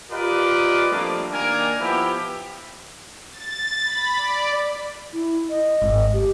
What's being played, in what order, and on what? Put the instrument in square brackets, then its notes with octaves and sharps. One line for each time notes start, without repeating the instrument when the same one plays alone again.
[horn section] F4 G4 A#4 B4 D5 D#5
F3 G3 A3 A#3 C4 D4
D#3 A#3 D4 A#4 G#5
F3 B3 E4 G4
[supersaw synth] A6
B5
D5
[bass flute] E4
D#5
[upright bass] G#1
[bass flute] G4